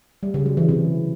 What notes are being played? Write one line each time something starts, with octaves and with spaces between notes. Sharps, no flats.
G3
C#3
F#3
E3
C3